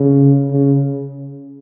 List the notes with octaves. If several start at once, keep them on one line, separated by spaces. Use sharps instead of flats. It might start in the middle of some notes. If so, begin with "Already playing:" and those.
Already playing: C#3
C#3